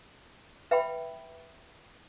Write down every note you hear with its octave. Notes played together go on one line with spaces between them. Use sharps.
B4 E5 G5 B5